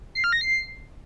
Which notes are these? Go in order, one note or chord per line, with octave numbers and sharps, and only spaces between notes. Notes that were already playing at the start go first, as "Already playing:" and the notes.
C7
F6
A#6
C7